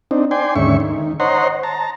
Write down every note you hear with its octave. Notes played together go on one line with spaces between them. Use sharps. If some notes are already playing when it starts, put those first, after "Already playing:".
C4 D4 D#4
D5 G5 G#5 C6
D#2 G#2 D3 C#4 E5 C#6
D#3
C5 C#5 D#5 F#5 A#5 C6
A5 A#5